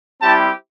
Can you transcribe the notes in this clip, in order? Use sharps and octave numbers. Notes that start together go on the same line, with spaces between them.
G3 C4 E4 G4 A5